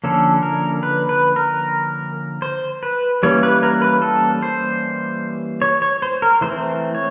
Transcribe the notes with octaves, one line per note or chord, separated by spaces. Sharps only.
D3 F3 A#3 C#4 A4
A#4
B4
B4
A#4
C5
B4
E3 G3 A#3 C#4 C#5
B4
A#4
B4
A4
C5
C#5
C#5
C5
A#4
E3 A3 C4 C5
C#5